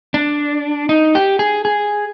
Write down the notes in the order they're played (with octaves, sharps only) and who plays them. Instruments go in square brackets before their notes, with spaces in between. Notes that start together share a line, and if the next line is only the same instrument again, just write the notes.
[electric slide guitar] D4
D#4
G4
G#4
G#4